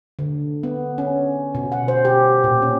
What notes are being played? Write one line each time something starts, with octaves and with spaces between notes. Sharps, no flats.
D3
B3
C#4
B2
F#5
C5
G4
A#2
C#4